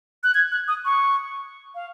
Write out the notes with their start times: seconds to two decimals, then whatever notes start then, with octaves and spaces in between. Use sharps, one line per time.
0.24 F#6
0.34 G#6
0.52 F#6
0.68 D#6
0.85 C#6
1.75 F5